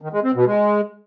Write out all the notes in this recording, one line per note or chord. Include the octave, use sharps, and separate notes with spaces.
D#3
G#3
C4
B2
G#3